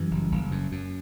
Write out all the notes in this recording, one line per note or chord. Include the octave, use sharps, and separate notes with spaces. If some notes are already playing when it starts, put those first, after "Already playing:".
Already playing: F#2 E3 G3
F#1
F#1
F#2
F#2